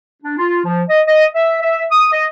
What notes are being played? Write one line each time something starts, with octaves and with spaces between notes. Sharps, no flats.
D4
F4
F3
D#5
D#5
E5
E5
D#6
D#5